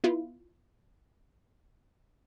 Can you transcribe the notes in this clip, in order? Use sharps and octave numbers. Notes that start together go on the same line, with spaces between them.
B3 E4 F4